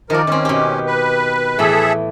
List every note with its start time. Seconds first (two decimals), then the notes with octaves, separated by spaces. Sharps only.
0.10 D#3 F3 A#4 D5
0.27 D#3 C4 C#4
0.45 B2 G4
0.87 B4
1.59 A2 E3 G#4 A4 E5 B5